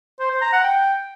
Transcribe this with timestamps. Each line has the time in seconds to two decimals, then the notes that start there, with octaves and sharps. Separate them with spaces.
0.20 C5
0.31 C5
0.42 A#5
0.53 F#5
0.64 G5